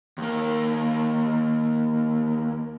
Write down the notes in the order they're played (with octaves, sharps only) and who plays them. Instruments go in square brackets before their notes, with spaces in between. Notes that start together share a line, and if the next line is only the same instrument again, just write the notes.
[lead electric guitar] D#2 A#3